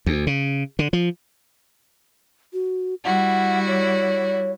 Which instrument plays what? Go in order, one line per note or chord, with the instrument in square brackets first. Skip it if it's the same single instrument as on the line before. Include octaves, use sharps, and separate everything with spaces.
[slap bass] D2
C#3
D3
F3
[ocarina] F#4
[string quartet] G3 E4 F#4 [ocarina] F#5
[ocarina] C#5